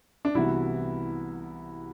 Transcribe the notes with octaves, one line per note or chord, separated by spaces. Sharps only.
D4
C2 C3 E3 B3 E4 F#4